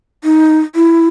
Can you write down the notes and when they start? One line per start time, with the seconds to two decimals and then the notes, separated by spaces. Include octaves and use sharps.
0.24 D#4
0.75 E4